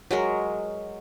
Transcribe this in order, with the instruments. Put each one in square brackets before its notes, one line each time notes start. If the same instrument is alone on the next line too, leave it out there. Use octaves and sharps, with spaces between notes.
[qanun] F#3 G#3 A#4